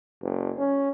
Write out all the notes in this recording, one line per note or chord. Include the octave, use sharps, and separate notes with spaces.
F#1
C#4